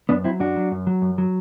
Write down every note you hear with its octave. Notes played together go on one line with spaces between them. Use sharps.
F#2 B3 D4
F#3 C4 E4
F#2 D4 F#4
F#3
F#2
F#3
F#2
F#3